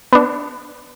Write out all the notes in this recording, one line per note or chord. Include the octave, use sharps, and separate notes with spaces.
B3 D4